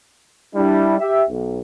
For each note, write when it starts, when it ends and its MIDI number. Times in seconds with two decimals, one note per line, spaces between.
0.56 0.97 55
0.56 0.97 62
0.56 0.97 64
0.99 1.23 67
0.99 1.23 76
1.29 1.60 35